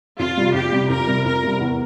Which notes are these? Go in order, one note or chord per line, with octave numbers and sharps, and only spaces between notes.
F2 F4
C3 G3
F2 G4
C3 G3
F2 A#4
C3 G3
F2 A#4
C3 G3
E2